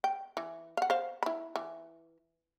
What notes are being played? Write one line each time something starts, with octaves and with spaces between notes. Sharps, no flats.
G5
E3
F5 F#5
C5 F5
E4 B5
E3